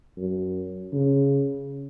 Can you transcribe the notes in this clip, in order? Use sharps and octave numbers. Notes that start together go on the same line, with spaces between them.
F#2
C#3